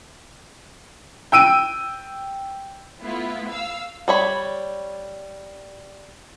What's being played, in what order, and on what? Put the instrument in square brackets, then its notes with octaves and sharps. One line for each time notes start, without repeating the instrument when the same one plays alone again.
[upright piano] G5 E6 D7 D#7
[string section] A3 B3 E4 F4
F5 E6
[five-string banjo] G3 C#5 B5